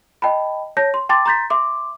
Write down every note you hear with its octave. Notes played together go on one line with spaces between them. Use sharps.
D#5 G5 A5 B5
C#5 A5 G6 A#6
C6
G5 A5 C6 D6 A6
A#5 C6 G6 A6 B6
E5 C6 D6